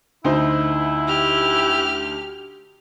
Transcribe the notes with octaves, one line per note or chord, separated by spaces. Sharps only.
D2 D#4 E4 C5
G4 F6